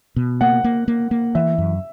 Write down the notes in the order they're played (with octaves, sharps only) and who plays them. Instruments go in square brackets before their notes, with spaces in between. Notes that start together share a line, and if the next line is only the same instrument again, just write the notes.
[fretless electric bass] B2
[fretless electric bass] A#3 [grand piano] F#5
[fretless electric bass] A#3
A#3
A#3
[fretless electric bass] E3 [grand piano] E5
[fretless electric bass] F#2